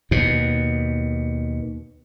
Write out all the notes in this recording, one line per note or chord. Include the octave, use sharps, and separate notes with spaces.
D#2 B2